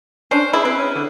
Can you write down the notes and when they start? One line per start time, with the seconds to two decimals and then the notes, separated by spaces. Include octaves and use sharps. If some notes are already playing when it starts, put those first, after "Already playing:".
0.31 C#4 D4 C5
0.53 E4 G#4
0.65 C4 B4
0.79 C#4
0.95 D3